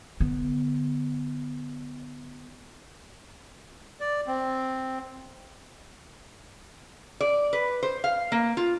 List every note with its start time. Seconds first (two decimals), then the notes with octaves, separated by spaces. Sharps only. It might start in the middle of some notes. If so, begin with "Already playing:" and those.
0.20 D3 B3
4.00 D5
4.27 C4
7.21 D5
7.53 B4
7.83 C5
8.04 F5
8.32 A#3
8.57 F4